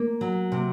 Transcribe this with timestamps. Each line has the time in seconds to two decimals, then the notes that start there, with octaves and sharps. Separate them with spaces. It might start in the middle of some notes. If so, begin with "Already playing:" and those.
Already playing: A#3
0.21 F#3
0.52 C3